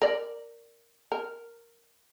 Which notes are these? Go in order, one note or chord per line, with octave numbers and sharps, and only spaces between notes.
A#4 D5
A#4